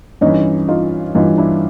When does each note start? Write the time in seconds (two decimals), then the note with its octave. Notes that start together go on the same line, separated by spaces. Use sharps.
0.21 G2 E3 C#4 D#4
0.68 D#4 F4
1.15 G2 E3 D#4 F4
1.38 D4 E4